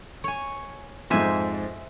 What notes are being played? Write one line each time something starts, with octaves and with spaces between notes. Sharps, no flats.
C#5 G#5
F2 G#2 C5 E5 G#5